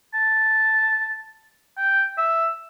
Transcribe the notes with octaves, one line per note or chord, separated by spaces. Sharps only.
A5
G5
E5